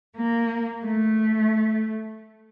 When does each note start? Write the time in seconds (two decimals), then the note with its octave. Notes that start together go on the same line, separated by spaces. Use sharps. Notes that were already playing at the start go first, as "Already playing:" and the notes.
0.16 A#3
0.87 A3